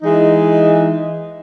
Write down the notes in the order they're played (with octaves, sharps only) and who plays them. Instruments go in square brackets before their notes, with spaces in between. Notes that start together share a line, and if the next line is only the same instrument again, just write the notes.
[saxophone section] E3 G#3 D#4